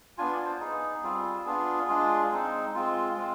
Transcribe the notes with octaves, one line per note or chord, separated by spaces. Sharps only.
B3 D4 F4 G#5
D5
C5
B3 D#4 G#4
G3 C4 F4
B3 D4 F4 G#4
G#3 D4 F4
G#3 C4 D#4
G#3 C4 F4
G#3 C4 F4